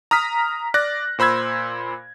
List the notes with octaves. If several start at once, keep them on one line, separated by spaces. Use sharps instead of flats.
A#5 D#6 F6 B6
D5 F#6 A#6
A#2 C5 B5 E6 G#6